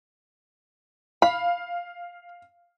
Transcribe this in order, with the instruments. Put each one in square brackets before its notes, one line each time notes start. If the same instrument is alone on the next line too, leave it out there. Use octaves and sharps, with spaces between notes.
[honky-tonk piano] F5 [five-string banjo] B5